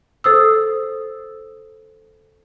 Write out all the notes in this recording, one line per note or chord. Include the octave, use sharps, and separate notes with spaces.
A4 C5 D#6 E6